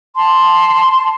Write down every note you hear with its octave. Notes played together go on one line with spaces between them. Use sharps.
A5 C6